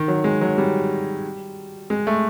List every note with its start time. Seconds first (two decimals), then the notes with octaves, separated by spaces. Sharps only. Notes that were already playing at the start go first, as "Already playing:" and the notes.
Already playing: D#3
0.08 F#3
0.24 G#3
0.41 F#3
0.58 G3
1.90 G#3
2.07 A3